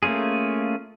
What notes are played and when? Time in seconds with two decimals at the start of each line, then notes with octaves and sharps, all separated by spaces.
0.03 A3 A#3 C#4 F4 G#4